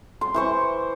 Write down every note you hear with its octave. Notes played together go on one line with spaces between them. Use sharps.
C6
E3 C5 C#6